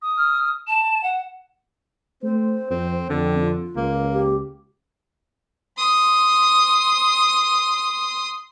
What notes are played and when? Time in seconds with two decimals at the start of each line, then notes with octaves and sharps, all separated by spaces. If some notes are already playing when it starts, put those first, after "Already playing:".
0.02 D#6
0.17 F6
0.67 A5 E7
1.03 F#5
2.23 A3 C4 C5
2.70 F2 C4
3.10 F2 D3 C4
3.41 F4
3.76 C#2 A#3
4.13 G4
5.77 C6 D#6